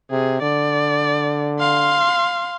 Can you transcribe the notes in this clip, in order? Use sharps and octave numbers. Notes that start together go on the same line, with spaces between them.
C3 G#4
D3 D5
F5 C6